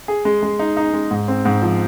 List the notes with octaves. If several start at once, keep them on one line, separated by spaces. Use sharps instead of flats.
G#4
G#3
G#3
D#4
D#4
G#3
G#2
C4
G#2
F3